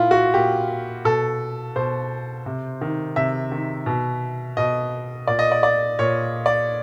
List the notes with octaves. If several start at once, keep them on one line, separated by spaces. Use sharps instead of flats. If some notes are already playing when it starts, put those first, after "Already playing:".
Already playing: A#2 E4 F4
F#4
A#2 G4
B2 A4
B2 C5
C3
D#3
C3 E5
D#3
B2
B2 D#5
A#2 D5
D#5
D5
D5
A#2 C#5
D5